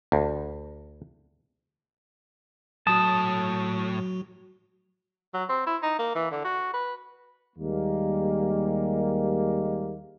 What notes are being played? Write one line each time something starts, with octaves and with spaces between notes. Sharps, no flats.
D2
A2 F#3 F#4 A5 D#6
F#3
C4
E4
D#4
A#3
E3
D3
F#4
B4
D#2 G3 G#3 A#3